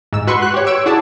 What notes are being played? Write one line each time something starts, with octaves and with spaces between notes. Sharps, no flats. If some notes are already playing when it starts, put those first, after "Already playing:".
G#2 E6
F#4 B4 C6 C#6
F#6
G4 C#5
C#5 E6 D7
E4 F#4 G#4 D5 A5